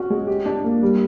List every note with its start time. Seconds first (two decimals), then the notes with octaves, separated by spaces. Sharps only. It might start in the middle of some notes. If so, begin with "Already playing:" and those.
Already playing: C#4 F#4
0.10 G#3
0.27 G4
0.45 D4
0.64 A#3
0.82 G3